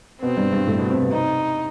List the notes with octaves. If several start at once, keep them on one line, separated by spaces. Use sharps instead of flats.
B2 B3 C4
G2 G3
G2 G3
A2 A3
B2 B3
C3 C4
B2 B3
C3 C4 D#4